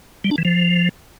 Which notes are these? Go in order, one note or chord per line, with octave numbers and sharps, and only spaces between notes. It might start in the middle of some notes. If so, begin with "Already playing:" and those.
G3
D4
E3
F3